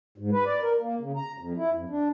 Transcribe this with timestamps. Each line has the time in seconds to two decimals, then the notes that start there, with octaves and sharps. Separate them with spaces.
0.18 G#2
0.33 B4
0.46 D5
0.62 A#4
0.80 A#3
1.00 C#3
1.16 A#5
1.38 F2
1.57 E4
1.72 F2
1.90 D4